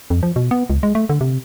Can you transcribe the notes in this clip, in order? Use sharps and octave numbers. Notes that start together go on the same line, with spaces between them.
F2
F3
B2
B3
C#2
G#3
A3
D3
C3